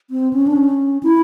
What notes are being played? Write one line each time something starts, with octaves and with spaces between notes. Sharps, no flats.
C4
C#4
D4
C#4
E4